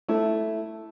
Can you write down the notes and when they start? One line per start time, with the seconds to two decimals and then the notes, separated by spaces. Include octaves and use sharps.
0.08 A3 E4